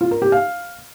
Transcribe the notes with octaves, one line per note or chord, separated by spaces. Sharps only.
F4
A#4
G4
F5